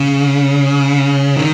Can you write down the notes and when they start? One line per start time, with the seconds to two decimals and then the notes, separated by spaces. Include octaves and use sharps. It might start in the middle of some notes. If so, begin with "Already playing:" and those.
Already playing: C#3
1.36 D#3